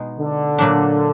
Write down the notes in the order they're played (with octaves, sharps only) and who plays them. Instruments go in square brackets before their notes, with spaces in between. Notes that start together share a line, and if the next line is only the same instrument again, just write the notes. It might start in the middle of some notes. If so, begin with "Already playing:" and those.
Already playing: [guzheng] B2 G#3 D#4
[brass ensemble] D3
[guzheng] A#2 F#3 D4